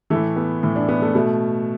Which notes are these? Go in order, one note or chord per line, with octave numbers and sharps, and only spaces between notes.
A2 E3 A3
B3
A2 E3
D4
B3
A3
B2 A3